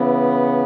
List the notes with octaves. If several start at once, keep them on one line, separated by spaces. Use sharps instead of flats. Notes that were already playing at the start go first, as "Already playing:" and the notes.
Already playing: C#3 E3 B3